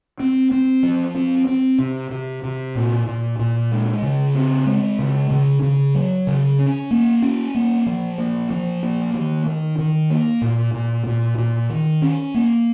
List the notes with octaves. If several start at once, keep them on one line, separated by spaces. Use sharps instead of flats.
C4
C4
F3
C4
C4
C3
C3
C3
A#2
A#2
A#2
G#3
C#3
C4
G#3
C#3
C#3
C#3
F#3
C#3
C#4
A#3
C#4
A#3
F3
A#3
F3
A#3
D#3
D#3
D#3
A#3
A#2
A#2
A#2
A#2
D#3
C#4
A#3